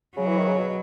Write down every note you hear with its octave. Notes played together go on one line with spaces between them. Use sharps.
C#3 F#3
E3
D#3
C#3
B2